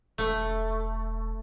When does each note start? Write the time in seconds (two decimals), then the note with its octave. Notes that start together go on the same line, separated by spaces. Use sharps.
0.18 E1 A3